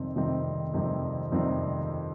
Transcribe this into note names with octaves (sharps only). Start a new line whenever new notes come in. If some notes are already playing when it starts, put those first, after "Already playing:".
Already playing: F2 C3 D#3 G3 C4
F2 C3 D#3 G3 C4
F2 C3 D#3 G3 C4
F2 C3 D#3 G3 C4